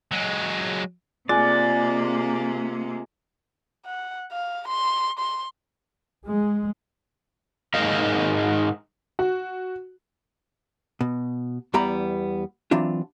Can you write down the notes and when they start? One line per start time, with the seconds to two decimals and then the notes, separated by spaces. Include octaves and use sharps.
0.12 F#3 G#3
1.29 C3 G#3 A#3 F4 D5
3.86 F#5
4.32 F5
4.68 C6
5.19 C6
6.28 G#3
7.74 G#2 G#3 A#4 D#5 F5
9.19 F#4
11.01 B2
11.74 E2 E3 G3 B3 A#5 B5
12.71 E3 F#3 C4 D4 F4